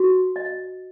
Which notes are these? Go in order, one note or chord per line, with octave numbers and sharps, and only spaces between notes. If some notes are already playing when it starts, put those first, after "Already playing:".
Already playing: F#4
D#5